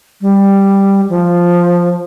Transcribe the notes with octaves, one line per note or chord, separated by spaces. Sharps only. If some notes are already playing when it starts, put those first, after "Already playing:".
G3
F3